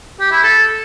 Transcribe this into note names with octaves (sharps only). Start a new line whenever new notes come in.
G4
E4
A4